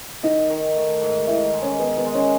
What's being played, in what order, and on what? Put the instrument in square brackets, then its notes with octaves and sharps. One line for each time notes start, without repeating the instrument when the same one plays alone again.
[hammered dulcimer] D#3 [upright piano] D#4 D#5
[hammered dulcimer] D#3
A3
G#2
[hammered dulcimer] D#3 [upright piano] E4 E5
[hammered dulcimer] G#3
[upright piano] C#4 C#5
[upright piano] B3 B4 [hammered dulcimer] G#4
[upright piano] B3 B4
[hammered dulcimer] G#3
[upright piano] C#4 C#5